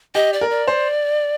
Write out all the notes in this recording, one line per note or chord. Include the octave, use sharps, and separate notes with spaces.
G4 D#5
D5
A#4
D5
C5